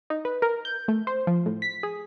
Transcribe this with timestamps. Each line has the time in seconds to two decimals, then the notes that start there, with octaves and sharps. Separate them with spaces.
0.10 D#4
0.25 B4
0.42 A#4
0.65 G6
0.88 A3
1.07 C5
1.27 F3
1.46 A2
1.62 B6
1.83 G#4